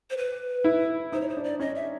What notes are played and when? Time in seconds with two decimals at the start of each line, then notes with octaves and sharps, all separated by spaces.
0.10 C5
0.17 B4
0.64 E4
1.12 D#4 C5
1.21 C#5
1.29 C5
1.37 D4
1.44 D5
1.60 C#4 D#5
1.75 E5